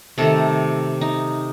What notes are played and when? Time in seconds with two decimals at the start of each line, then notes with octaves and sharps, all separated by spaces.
0.18 C3 D#3 A3 A4
1.01 D#4